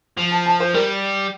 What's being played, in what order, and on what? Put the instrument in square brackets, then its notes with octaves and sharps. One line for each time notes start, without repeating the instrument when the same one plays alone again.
[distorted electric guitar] F3
[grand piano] A5
A5
C5
[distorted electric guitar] G3 [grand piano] A#4